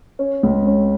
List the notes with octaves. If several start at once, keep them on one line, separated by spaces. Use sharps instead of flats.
C#4
C#2
C#4